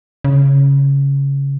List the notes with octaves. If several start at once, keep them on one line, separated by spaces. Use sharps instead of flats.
C#3